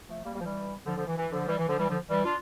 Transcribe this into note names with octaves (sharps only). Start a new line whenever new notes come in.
F3 A3
G3 A#3
G3 A#3
F3
E3 G3
D3 F3
D3 F3
E3
E3
D3 F3
E3 G3
E3
D3 F3
E3 G3
D3 F3
E3 G3
D4 F4